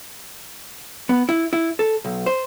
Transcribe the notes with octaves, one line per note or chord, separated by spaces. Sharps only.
B3
E4
E4
A4
B1
C5